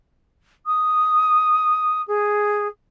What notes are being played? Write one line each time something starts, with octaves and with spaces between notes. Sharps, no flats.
D#6
G#4